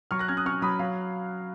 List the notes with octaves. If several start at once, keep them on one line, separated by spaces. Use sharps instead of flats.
F#3 C#6 F6
F#6 A#6
C#4 F6 G#6
D#6 F#6
C#4 C#6 F6
F#3 B5 D#6
F#3 F5